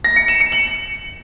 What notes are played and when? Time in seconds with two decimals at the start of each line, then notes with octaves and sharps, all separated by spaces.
0.04 A#6
0.16 C#7
0.28 E7
0.40 C#7
0.52 F#7